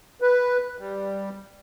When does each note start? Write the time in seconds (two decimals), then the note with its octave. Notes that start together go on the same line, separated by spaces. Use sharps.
0.21 B4
0.78 G3